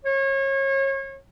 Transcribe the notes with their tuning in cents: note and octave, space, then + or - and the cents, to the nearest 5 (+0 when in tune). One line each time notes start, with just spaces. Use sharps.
C#5 -30